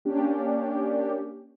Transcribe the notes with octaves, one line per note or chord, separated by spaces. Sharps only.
A#3 C#4 D4 G4